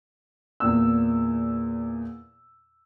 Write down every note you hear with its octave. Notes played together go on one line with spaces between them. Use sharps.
E2 A#2 E6